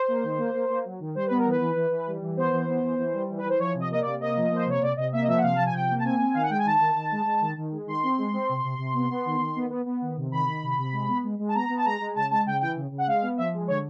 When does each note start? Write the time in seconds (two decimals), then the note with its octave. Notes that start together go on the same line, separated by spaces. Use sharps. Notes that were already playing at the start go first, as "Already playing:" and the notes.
Already playing: C5
0.08 A#3
0.24 D#3
0.38 A#3
0.54 A#3
0.69 A#3
0.84 F#3
1.00 D#3
1.15 G3 C5
1.26 B3 B4
1.38 A#4
1.45 E3 B4
1.61 E3
1.76 E3
1.91 E3
2.07 G3
2.22 E3
2.37 B3 C5
2.53 E3
2.68 B3
2.83 E3
2.98 E3
3.13 G3
3.29 E3
3.38 B4
3.44 E3 C5
3.59 F3 C#5
3.74 C3
3.80 D#5
3.90 A#3 D#5
4.00 C3 D5
4.21 A#3 D#5
4.36 F3
4.51 A#3 C5
4.66 C3 C#5
4.82 C3 D5
4.97 C3 D#5
5.12 A#3 E5
5.22 D#5
5.28 F3 E5
5.37 F#5
5.42 C3 F5
5.55 F3 A5
5.65 G#5
5.73 C3 G5
5.89 A#3
5.99 A5
6.03 C4 G#5
6.19 C4
6.34 D#3 F5
6.42 F#5
6.50 G#3 G5
6.58 G#5
6.65 D#3 A5
6.80 D#3
6.95 D#3
7.12 G#3
7.26 G#3
7.41 D#3
7.57 D#3
7.72 G#3
7.87 D#3 C6
8.03 C4
8.18 G#3
8.33 C4
8.49 C3
8.64 C3
8.78 C3
8.94 B3
9.10 B3
9.26 D#3
9.40 D#3
9.56 B3
9.70 B3
9.86 B3
10.02 D#3
10.17 C3
10.32 D#3 B5
10.47 D#3
10.63 C3
10.77 C3
10.92 G#3
11.08 B3
11.24 G#3
11.39 G#3
11.49 A5
11.54 B3 A#5
11.69 B3
11.77 A5
11.85 G#3 A#5
12.01 G#3
12.15 C#3 A5
12.31 G#3 A5
12.46 C#3 G5
12.61 E3 G5
12.76 C#3
12.91 C#3
12.98 F#5
13.07 G#3 F5
13.22 B3
13.37 F3 E5
13.54 G#3
13.68 D3 C#5